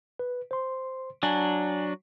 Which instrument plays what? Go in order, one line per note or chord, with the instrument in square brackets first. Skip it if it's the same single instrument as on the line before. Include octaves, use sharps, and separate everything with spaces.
[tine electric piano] B4
C5 C6
[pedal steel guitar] F#3 D4 [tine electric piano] G#5